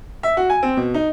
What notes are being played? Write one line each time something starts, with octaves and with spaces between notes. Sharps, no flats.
E5
F#4
G#5
C4
B2
D#4